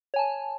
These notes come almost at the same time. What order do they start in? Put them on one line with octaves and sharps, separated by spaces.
C#5 G#5 A5